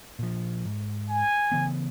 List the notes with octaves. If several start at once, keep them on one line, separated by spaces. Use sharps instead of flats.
A#2 F3
G#2
G#5
C#3 E3 B3